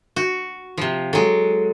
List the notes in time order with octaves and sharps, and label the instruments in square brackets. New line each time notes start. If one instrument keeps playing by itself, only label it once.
[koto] F#4
C3 F3
[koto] F#3 G#3 [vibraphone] A4